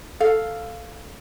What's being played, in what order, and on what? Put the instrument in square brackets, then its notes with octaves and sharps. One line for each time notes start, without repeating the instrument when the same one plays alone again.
[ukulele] A4 F5